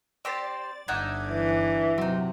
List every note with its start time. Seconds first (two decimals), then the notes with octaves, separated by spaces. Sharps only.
0.25 C4 G4 C5 D5 A6
0.88 G1 D4 D#4 E5 F#5 D6 G#6
1.30 E3
1.98 C3 F#3 C4 D#4